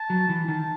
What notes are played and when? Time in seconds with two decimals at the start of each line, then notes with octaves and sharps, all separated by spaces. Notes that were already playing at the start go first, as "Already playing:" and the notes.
Already playing: A5
0.10 F#3
0.29 E3
0.48 D#3 A5